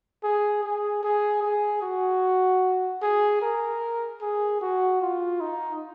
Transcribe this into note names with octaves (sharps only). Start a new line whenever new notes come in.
G#4
G#4
G#4
G#4
F#4
G#4
A#4
G#4
F#4
F4
D#4